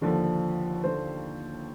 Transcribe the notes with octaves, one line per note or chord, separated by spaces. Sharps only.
D#2 D3 F3
D3 F3 C5